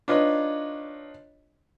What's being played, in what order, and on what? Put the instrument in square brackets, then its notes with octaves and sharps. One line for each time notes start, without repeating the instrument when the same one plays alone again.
[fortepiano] D4 D#4 F4 B4 C#5 D#5